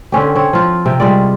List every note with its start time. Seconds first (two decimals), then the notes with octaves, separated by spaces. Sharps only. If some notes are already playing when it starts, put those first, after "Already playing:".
0.12 D3 C4 C#4 G4
0.35 C4 C#5
0.53 F3 F4
0.86 C3 E5 G5
1.00 G3 G#3 F4 D5